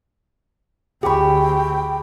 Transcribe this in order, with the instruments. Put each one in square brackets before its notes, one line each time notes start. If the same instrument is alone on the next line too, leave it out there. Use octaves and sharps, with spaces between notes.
[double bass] D2 [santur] G4 C#6 [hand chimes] G#4 B5 [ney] G5